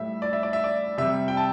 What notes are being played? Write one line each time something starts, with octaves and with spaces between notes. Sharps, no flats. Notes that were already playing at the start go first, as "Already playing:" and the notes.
Already playing: A2 G3 E5
D5
E5
D5
E5
D5
C3 G3 E5
G5
A5